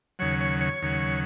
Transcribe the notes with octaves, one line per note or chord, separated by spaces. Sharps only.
D#2 C#3 F#3 C#5
C#5
C#5
D#2 C#3 F#3